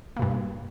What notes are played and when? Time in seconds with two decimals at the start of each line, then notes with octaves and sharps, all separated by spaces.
0.16 A#3
0.19 B2
0.22 G2